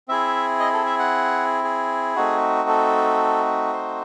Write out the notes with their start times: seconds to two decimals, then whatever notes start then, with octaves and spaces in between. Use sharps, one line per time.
0.08 C4 E4 G#4 E5
0.60 D#5
0.73 A4
0.86 E5
0.99 F#5
1.64 G#4
2.16 A3 C4 D#4 F#4
2.69 A4
3.73 C5